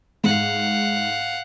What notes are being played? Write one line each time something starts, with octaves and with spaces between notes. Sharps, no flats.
G#2 F5 F#5